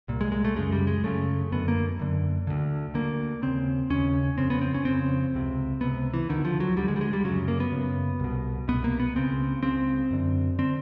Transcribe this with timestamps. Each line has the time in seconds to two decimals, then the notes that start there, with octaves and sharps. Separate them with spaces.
0.08 C2 A#2
0.21 G#3
0.32 G#3
0.45 A3
0.56 F#2 C#3 G#3
0.72 G3
0.87 G#3
1.04 F#2 C#3 A3
1.52 F#2 D3 B3
1.68 A#3
1.99 F#2 D3
2.47 D2 D3
2.94 D2 D3 A#3
3.42 D#2 C#3 C4
3.90 D#2 C#3 C#4
4.38 F2 C#3 C4
4.50 B3
4.61 C4
4.74 C#4
4.85 F2 C#3 C4
5.34 C#2 C3
5.81 C#2 C3 B3
6.14 E3
6.29 D2 D3 D#3
6.45 F3
6.60 F#3
6.77 D2 D3 G3
6.88 G#3
6.96 G3
7.01 G#3
7.13 G3
7.24 F#2 C#3 F#3
7.48 A#3
7.60 B3
7.72 F#2 C#3
8.20 C2 B2
8.68 C2 B2 B3
8.84 A#3
9.00 B3
9.15 C#2 C#3 C4
9.63 C#2 C#3 C4
10.11 F#2 D3
10.59 D3 C4